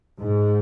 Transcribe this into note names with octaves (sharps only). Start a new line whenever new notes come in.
G#2